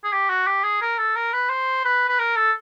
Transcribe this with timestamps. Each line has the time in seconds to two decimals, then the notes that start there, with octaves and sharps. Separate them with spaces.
0.04 G#4
0.13 G4
0.29 F#4
0.47 G4
0.63 G#4
0.81 A#4
0.98 A4
1.16 A#4
1.33 B4
1.50 C5
1.85 B4
2.08 B4
2.19 A#4
2.36 A4